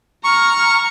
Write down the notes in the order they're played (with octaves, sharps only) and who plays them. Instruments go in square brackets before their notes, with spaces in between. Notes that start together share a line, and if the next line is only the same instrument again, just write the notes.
[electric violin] A#5 F6 [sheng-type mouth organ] C#6